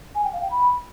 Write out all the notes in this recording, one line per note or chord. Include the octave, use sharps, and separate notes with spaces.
G#5
G5
F5
G5
B5